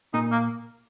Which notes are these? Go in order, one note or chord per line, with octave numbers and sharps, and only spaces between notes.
A#2 D#4
A#3